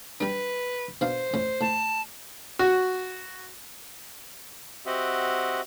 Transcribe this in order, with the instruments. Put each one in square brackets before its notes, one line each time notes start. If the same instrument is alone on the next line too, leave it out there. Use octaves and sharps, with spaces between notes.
[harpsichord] G3 D4 [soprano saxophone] B4
[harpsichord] B2 D4 F5 [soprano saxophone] C5
[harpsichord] A2 C#4
[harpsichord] A2 [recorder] A5
[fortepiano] F#4
[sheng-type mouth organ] C4 F#4 G4 D#5 E5 F#5